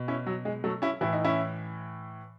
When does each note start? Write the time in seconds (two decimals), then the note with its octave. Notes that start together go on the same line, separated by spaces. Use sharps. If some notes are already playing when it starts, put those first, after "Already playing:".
Already playing: B2
0.08 C#4 E4
0.27 F#3
0.45 G#3
0.64 F#3 A3
0.82 C#4 E4
1.01 A2 E3 E4
1.13 D#4
1.24 C#4 E4